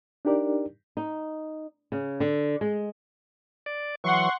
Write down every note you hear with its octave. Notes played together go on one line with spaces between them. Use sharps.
D4 D#4 G4 A#4 D5
D#4
C#3
D3
G#3
D5
E3 F#3 F#5 C6 C#6